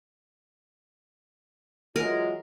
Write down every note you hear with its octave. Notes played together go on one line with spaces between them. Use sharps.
E3 F#3 G#3 F4 A#4